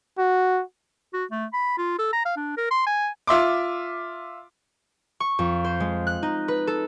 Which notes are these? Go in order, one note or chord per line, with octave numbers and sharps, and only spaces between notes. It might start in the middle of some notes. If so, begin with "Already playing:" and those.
F#4
F#4
A3
B5
F4
A4
A#5
F5
D4
A#4
C6
G#5
F4 E5 C6 D6
C#6
F2
C5
G#3
F#6
D#4
B4
A4